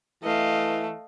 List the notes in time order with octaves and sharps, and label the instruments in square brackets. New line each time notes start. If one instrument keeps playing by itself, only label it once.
[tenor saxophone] E3 [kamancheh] A3 [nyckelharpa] D#5 F5